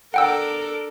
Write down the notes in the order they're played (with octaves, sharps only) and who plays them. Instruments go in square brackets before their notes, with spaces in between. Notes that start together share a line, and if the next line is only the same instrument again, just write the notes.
[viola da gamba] D4 A4 A#4 [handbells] F#5 G5 E6